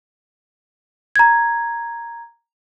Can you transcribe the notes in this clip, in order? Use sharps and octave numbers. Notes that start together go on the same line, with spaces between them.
A#5 G#6